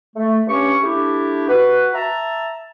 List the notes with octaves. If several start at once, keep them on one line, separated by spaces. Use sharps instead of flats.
A3
G2 C#4 G4 C#5 C#6
A3 D4 E4 G4
F#4 B4
E5 A5 A#5